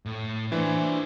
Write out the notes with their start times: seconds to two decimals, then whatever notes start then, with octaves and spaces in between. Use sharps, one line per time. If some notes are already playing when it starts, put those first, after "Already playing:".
0.06 A2
0.52 E3 D4 C5